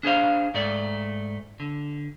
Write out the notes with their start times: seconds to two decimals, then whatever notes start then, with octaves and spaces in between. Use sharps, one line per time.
0.03 D4 G#4 C5 F5
0.54 G#2 A3 D5
1.60 D3